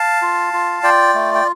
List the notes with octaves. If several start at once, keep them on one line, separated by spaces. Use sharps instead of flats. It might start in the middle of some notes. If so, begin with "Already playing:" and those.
Already playing: F5 A5
F4
F4
F4 D5 G5
A3
G5